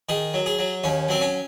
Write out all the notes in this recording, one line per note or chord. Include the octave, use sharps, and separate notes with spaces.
D#3 G#4
F#3
G#4
F#3
D#2 C#4
F#3 C4
C#4